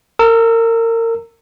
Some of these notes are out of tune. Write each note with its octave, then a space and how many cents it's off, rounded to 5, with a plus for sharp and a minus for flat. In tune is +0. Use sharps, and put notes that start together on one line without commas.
A#4 -30 E6 +0